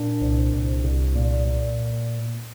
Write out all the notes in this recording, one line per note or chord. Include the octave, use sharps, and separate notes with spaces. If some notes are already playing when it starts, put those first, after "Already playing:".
Already playing: A#2 D4
C2
C2
C2
A#2
A#2